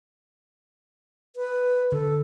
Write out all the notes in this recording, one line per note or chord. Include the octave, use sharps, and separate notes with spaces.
B4
D3 A4